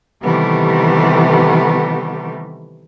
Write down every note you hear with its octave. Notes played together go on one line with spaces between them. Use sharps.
C3 D#3 E3 G3 A3 B3